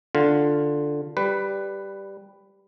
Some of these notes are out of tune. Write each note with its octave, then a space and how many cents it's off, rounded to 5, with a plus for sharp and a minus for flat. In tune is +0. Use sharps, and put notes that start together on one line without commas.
D3 +0 F4 +0
G3 +0 B4 +10